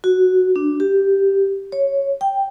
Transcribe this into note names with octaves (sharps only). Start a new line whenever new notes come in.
F#4
D4
G4
C#5
G5